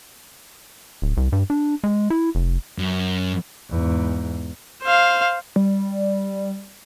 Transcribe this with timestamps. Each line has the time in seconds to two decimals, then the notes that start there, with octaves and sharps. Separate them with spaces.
1.02 D1
1.17 C2
1.32 G2
1.50 D4
1.84 G#3
2.10 E4
2.35 F1
2.78 F#2
3.70 E2 G#2
4.83 C5 F5
5.56 G3